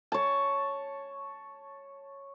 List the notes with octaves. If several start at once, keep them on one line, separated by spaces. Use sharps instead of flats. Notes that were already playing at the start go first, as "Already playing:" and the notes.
C#5 A5